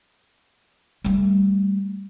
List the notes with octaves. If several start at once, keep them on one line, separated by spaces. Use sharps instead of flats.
G3 A3